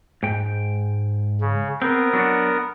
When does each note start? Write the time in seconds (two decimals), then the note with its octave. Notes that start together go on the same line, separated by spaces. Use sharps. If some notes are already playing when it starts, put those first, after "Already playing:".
0.23 G#2 G5
1.41 C#3
1.82 B3 C4 A#4
2.13 F#3 D4 F#4